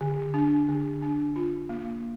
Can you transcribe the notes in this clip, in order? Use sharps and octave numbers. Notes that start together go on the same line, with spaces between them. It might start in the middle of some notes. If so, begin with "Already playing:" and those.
D3
D4
D3
D4
F4
A#3